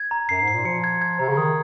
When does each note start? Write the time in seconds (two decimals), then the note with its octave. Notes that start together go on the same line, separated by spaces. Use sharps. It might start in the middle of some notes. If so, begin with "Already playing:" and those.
Already playing: G#6
0.11 A#5
0.29 F#2 C7
0.41 G#2
0.48 C7
0.53 A#2
0.65 F3 C#7
0.84 G#6
1.02 G#6
1.19 C3 A#5
1.29 C#3
1.37 D#3 D#6